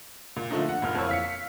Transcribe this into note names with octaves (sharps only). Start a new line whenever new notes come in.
A#2
D3 F3 A3 C4 D#4
F#5
E1 A#2 F6
F2 E3 A#3 C#5 E6
F5 B6 C#7